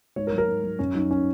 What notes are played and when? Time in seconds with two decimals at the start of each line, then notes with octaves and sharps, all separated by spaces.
0.16 G#2 C#5
0.27 A#4
0.32 F#3
0.38 A#4
0.48 G#2
0.64 F#3
0.79 F#2 C#4
0.94 F#3 D#4
1.11 C#4